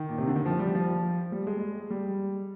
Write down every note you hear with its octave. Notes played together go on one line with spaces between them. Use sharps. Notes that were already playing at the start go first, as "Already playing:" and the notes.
Already playing: D#3
A#2
C3
D3
D#3
F3
G3
F3
G3
G#3
G3